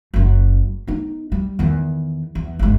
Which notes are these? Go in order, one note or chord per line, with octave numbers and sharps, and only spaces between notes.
F#1 F#2
B3 D#4
G3
E2 D#3
E2
G1 G#2